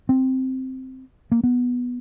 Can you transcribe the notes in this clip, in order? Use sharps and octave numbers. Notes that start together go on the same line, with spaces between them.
C4
A#3
B3